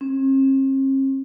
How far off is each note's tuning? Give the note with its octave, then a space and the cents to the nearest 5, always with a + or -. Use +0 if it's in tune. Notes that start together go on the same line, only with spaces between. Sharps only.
C4 +45